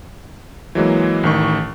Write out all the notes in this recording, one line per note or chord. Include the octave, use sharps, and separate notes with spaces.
E3 F#3 G#3 A#3
A1 D#3 C#6